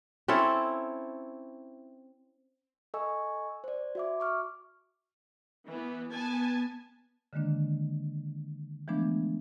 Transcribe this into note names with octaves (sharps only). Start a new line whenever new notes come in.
C4 C#4 E4 A4
A4 D#5 G#5 C#6 E6
C5 D5
F#4 E5 D6
C#6 D6 F6
E3 B3
B3 G#5 A5
D3 D#3 G#3 A#3 D4
E3 F3 G#3 A3 B3 D4